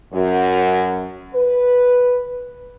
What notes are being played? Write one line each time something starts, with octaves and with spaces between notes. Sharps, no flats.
F#2
B4